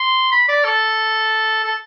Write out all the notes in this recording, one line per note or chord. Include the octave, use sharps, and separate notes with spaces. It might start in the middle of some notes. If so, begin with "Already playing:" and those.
Already playing: C6
B5
D5
A4
A4